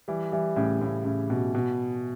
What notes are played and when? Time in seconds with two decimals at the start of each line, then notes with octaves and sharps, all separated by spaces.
0.08 E3 G3
0.32 E3 G3
0.56 A2 C#3
0.81 A2 C#3
1.05 A2 C#3
1.30 B2
1.55 B2